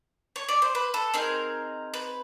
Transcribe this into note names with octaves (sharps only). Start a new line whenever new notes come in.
C#5
D5
C5
B4
A4
C4 D#4 G#4 A#4
B4